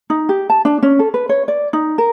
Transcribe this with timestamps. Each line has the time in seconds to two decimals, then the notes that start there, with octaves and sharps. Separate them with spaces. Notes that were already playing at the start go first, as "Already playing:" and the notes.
0.10 D#4
0.29 G4
0.50 A5
0.65 D4
0.83 C#4
0.99 A4
1.14 B4
1.29 C#5
1.48 D5
1.73 D#4
1.98 A#4